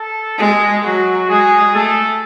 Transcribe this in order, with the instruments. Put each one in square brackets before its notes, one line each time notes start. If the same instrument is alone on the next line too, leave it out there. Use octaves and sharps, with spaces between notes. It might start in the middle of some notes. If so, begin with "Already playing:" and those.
Already playing: [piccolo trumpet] A4
[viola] G#3 [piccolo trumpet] G#4
[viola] F#3 [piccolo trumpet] F#4
[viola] G#3 [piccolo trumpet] G#4
[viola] A3 [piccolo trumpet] A4